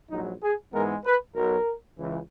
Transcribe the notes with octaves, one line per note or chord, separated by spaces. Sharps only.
A#1 G#2 F#3 D#4
G#4
G#2 E3 G#3 B3 A#4
B4
B1 B2 F#3 A#4
C#2 C#3 E3